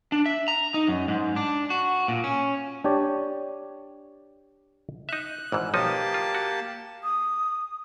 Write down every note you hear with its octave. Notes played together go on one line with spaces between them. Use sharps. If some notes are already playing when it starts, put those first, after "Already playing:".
D4
E5
A#5
D#4
F#2
G#2
D4
F#4
A#2
C#4
D4 G4 C#5 D5
D#4 E5 F#6
G#1 G#2 E3
B1 F3 A#3 D#4 G4 A5
F4
F#4
D#6